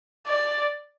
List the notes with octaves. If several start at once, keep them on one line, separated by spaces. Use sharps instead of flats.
D5